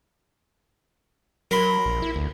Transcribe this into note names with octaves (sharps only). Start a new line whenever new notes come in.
F#3 A#4 B5 C6
A#1
E4
D2